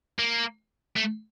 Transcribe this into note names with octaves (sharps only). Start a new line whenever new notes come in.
A#3
A3